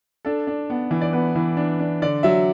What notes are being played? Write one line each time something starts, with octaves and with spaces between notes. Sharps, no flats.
D4 A4
D4
B3
E3
D5
B3 B4
E3
D4
D4
D3 D5
F#3 E5